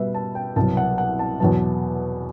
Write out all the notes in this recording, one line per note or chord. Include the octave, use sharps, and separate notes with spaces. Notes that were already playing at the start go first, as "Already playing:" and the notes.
Already playing: B2 G3 B3 B4 E5
A5
G5
C2 B2 F#3 A5
F#5
F#5
A5
E2 B2 F#3 B3 A5